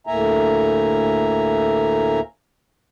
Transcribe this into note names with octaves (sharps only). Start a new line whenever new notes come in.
D2 A2 A#3 E5 G#5 A#5